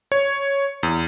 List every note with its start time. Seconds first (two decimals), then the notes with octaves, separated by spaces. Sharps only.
0.12 C#5
0.83 E2